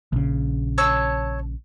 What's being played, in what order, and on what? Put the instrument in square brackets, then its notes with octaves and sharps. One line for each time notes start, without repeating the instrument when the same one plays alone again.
[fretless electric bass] A#1 C#3
[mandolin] C#5 A5 E6